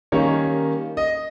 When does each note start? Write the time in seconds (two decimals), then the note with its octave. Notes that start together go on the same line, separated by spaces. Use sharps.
0.12 D#3 G3 A#3 C#4 C#5
0.97 D#5